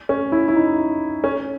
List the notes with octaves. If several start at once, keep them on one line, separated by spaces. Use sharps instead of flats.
C#4
E4
E4
D#4
C#4